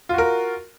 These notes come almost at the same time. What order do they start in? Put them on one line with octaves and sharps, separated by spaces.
F4 F#4 A#4